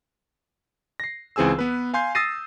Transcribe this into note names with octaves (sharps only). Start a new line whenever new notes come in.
A#6 C7
C#2 E3 C4 G#4 G#5 E6
B3 B4
F5 G#5 C6 G6 C7
D#6 E6 A6 A#6 C7 D#7